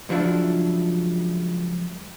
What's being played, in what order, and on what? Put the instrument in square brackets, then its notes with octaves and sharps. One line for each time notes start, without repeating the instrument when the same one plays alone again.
[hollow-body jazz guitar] C#2 F3 F#3 D4 E4